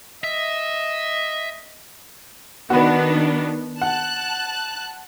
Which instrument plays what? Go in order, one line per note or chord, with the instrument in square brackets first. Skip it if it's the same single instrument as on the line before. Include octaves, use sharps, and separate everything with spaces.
[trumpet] D#5 [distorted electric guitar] E5
[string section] D#3 B3 D4 [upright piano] F#4 B4
[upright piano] F#5 [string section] A5 F#6